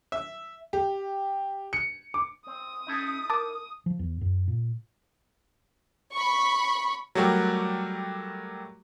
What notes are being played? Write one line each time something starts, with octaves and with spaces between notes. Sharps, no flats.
E5
G4
C#7
D6
C4 D#6
C#4 D#4 E4 A4
A#4 A5 D6
F3
E2
F#2
A#2
B5 C#6
F#3 G3 A3 F#4 G4 A#4